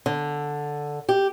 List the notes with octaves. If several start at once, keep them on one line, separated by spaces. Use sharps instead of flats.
D3
G4